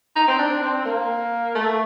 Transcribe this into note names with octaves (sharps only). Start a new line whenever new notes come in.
D#4
C4
D4
C4
A#3
A3